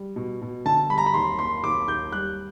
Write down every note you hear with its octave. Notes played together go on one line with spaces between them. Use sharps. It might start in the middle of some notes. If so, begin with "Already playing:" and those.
Already playing: G3
B2
B2
D3 A5
G3 B5
A#5
B5
D#2 C6
A#3 C6
D#2 D6
D#2 G6
G3 F#6